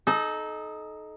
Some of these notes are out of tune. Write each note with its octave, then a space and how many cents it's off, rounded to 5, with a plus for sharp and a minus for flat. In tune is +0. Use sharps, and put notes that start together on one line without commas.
D#4 +0 A4 -30